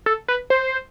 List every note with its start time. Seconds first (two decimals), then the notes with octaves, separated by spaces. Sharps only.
0.06 A4
0.28 B4
0.50 C5